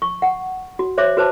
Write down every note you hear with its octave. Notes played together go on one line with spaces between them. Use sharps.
C#6
F#5
F#4
C5 C#5 E5 C6 D6
F#4 B4 C5 A5 D6